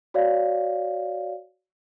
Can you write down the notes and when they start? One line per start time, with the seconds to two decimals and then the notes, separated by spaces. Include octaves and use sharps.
0.14 F#4 C#5 D5 F5